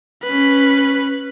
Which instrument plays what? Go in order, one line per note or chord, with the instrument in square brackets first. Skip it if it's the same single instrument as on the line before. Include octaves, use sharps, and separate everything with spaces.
[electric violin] C#4 B4